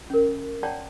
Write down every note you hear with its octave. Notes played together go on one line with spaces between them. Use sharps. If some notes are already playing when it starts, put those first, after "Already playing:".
C#4 A#4
C#5 D5 F#5 G5 A5 A#5